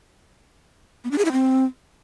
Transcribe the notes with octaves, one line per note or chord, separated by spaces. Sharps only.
B3
D4
G#4
E4
C4